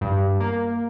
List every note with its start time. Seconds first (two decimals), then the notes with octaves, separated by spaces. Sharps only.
0.01 G2
0.40 A#3